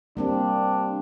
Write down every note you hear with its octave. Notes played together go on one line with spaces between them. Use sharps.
G3 A#3 C4 D4